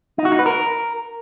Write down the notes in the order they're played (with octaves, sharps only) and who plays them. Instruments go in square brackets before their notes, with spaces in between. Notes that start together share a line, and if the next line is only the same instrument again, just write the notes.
[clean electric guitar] D#4
F#4
D#4
B4
A#4